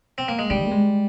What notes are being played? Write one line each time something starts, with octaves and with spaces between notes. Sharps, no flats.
C4
A#3
G#3
C3 G3
A#3
G#3